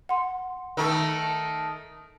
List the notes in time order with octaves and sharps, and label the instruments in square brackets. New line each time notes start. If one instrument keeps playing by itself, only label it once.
[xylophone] F#5 C6
[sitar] D#3 A3